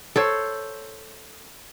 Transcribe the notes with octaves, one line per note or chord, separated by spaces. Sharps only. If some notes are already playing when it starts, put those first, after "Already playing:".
A4 C5 C#5